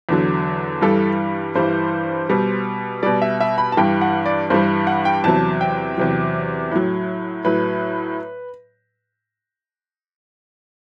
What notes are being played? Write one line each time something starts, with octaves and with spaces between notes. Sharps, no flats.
E2 D3 F#3
G2 E3 G3 A4
G2 E3 G3 C5
B2 G3
B2 G3 D5
E5
E5
B5
A5
G2 E3 G3 G5
F#5
D5
G2 E3 G3 C5
F#5
G5
E2 C3 F#3 A5
G5
E2 C3 F#3
A2 F#3
A2 F#3 B4